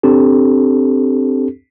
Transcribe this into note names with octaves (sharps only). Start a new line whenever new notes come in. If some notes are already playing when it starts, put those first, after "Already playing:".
C4 D4 G4 A4